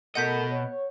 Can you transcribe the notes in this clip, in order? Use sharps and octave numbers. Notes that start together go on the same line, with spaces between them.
B2 A3 A4 A#4 D#5 F#5 G6 B6
C#5